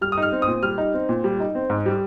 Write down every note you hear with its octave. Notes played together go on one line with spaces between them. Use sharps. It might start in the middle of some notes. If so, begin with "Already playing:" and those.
G3 F6
D#6
D#4 F6
C4
D#6
A#2
G3 F6
D#4
C4
A#2
G3
D#4
C4
G#2
G3